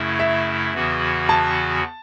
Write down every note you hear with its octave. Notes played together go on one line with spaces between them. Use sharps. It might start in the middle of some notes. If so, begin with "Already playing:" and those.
Already playing: F#2 C#3 A3 E4
E5
E2 C#3 E3 B3 F#4
A5